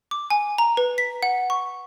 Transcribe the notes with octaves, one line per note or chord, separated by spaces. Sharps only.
D6
G#5
A#5
B4
B6
F#5
C#6